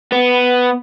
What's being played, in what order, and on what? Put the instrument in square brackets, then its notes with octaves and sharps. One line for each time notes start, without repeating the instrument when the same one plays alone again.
[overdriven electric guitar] B3